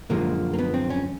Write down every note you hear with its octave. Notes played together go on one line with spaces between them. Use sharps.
F#2 D3 F3 G#3 A#3
A#3
B3
C4
C#4